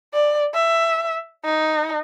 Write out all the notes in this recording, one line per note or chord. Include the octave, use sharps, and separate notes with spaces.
D5
E5
D#4